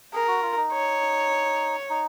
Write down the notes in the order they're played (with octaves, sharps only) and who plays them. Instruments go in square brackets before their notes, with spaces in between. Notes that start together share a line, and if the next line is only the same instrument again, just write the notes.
[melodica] G#4 [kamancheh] A#4
[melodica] F#4
F4
D#4
[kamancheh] C#5
[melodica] D#4